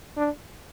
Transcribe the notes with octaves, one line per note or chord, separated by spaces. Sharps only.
D4